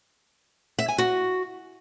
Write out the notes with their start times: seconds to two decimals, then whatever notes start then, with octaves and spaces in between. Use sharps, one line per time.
0.79 E5
0.88 G#5
0.98 F#4